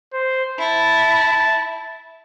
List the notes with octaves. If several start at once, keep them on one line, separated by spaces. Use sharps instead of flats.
C5
E4 A5